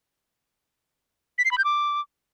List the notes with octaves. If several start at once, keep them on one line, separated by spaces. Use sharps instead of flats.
B6
C7
B5
G6
D6